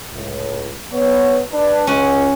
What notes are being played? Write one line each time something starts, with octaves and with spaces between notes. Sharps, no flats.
C#2 A2
B3 C#5
D4 B4
C#2 C#4 F#5